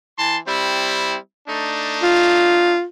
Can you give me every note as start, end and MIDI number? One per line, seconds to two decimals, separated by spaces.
0.18 0.37 52
0.18 0.37 81
0.18 0.37 84
0.48 1.17 55
0.48 1.17 60
0.48 1.17 64
1.48 2.75 57
1.48 2.75 62
1.48 2.75 63
2.03 2.85 65